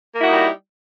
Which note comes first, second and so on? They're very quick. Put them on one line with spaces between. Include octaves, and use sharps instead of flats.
A#3 E4 F#4 D#4 G3